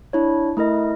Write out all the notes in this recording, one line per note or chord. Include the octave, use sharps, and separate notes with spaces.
D4 E4 C#5
A3 E4 A#4 D#5